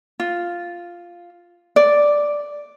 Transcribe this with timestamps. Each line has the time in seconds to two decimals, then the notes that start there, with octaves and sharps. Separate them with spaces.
0.20 F4
1.76 D5